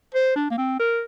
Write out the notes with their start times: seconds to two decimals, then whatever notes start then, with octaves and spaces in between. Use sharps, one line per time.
0.14 C5
0.36 D4
0.51 A#3
0.58 C4
0.79 A#4